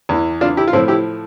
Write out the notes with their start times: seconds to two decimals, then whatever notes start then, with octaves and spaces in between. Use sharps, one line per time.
0.09 E2 E3
0.41 D4 F4
0.57 E4 G4
0.68 F4
0.73 A2 C4 E4
0.76 F3
0.88 E4 G4